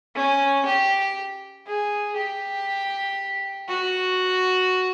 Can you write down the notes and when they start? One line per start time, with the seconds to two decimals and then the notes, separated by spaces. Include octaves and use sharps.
0.16 C#4
0.65 G4
1.67 G#4
2.17 G4
3.68 F#4